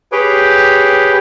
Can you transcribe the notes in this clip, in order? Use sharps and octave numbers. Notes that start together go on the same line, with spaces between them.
G4 G#4 B4 C#5 G5